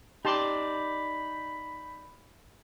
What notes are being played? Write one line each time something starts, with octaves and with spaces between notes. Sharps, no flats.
D#4 G4 D5 A5 B5 C6